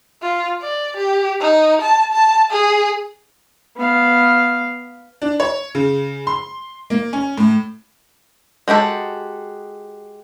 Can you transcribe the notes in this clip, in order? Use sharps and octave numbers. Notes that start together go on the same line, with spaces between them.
F4
D5
G4
D#4
A5
A5
G#4
B3 F5
D4
C#5
C#3
C6
A#3
C#4
A2
G#3 F#4 G4 A4